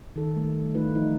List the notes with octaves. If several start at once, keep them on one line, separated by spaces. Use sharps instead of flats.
D#3 A4
G3 A3
E3 A3 D#4 F4 B4
F3 D#4